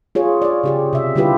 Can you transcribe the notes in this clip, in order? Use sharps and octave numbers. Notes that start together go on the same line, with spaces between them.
F4 G#4 C#5
C#5 D5
C#3 G4 G#4
C3 E5
D3 G3 E4 F4 G4 B4